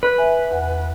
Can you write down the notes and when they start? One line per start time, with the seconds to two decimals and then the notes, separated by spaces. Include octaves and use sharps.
0.03 B4
0.18 E5 G#5
0.51 E2 F#5